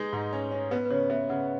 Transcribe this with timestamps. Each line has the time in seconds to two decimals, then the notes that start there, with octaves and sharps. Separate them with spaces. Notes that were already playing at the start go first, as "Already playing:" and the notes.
Already playing: G#3 D#4 B4
0.13 G#2
0.33 C#4
0.51 C#4
0.71 B3 B4
0.85 B4
0.91 C#3 C#5
1.10 B3 E5
1.29 C#3 F#5